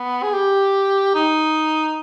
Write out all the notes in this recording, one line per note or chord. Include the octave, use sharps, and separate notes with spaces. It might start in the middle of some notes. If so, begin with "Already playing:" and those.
Already playing: B3
G#4
G4
D#4